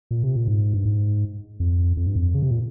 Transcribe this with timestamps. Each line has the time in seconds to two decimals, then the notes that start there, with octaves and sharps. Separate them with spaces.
0.11 A#2
0.23 C3
0.35 A#2
0.48 G#2
0.74 G2
0.85 G#2
1.60 F2
1.97 F2
2.06 G2
2.16 F2
2.34 C#3
2.42 C3
2.51 A#2